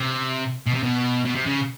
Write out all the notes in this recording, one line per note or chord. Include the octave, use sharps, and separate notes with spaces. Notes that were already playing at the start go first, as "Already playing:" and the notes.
Already playing: C3
B2
C3
B2
B2
C3
C#3